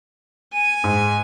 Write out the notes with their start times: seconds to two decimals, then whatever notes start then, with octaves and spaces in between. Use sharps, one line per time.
0.53 G#5
0.84 G#2